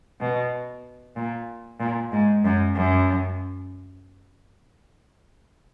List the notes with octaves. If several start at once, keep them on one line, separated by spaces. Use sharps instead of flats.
B2
A#2
A#2
G#2
F#2
F#2